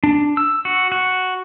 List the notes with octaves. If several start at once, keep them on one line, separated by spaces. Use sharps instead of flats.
D4
E6
F#4
F#4